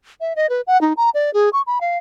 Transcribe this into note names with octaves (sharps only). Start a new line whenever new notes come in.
E5
D#5
B4
F#5
D#4
A#5
D5
G#4
C#6
B5
F5